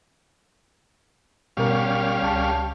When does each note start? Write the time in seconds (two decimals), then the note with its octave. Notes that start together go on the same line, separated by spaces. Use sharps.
1.57 G#1 B2 G3 C#4 A#4 F5
2.23 C#2 A5